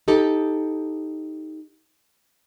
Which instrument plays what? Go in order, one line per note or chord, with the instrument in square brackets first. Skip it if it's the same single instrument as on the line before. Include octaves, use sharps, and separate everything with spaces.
[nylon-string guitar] D#4 G4 A4